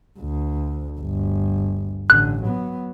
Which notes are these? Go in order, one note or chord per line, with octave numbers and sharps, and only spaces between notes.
D2
G1 D2
A1 D3 F#6
F#3 B3